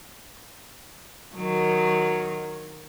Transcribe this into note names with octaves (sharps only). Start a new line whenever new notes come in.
D#3 F#3